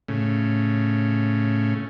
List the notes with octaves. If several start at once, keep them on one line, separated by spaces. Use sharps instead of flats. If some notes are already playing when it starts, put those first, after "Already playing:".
A2 C#3